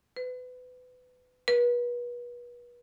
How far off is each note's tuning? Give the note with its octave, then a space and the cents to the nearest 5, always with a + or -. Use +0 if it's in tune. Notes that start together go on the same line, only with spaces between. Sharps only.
B4 +30
B4 -35